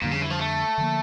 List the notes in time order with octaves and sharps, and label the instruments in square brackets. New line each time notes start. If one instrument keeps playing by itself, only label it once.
[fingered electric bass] F2 D3 G3 [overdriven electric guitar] A#2
[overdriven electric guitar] C#3
E3
F3
A3
[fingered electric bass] D3 F3 A#3